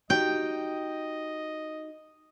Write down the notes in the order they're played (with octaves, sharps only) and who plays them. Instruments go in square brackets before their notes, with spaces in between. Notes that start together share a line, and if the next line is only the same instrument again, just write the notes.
[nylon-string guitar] D#4 F#4 G4 [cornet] D#5 [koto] G5